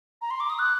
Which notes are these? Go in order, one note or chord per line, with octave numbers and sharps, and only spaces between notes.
A#5
C6
D6
D#6
F#6